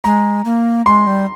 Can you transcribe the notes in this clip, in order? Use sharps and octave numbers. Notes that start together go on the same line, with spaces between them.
G#3 A#5
A#3
G#3 C6
G3